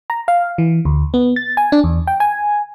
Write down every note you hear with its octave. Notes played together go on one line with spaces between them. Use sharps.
A#5
F5
E3
D2
B3
A6
G#5
D4
E2
G5
G#5